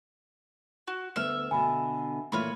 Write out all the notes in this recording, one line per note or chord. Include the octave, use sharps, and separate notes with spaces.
F#4
D2 B3 E5 F6
B2 D3 G#5 B5
A#2 E3 A3 F4 C#5 B5